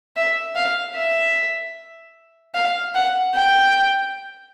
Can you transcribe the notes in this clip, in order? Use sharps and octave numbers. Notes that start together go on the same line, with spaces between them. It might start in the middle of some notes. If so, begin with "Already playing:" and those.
E5
F5
E5
F5
F#5
G5